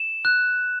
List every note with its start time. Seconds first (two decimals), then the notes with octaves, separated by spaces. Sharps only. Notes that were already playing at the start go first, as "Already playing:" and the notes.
Already playing: E7
0.25 F#6